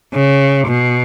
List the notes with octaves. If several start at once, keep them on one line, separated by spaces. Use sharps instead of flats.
C#3
B2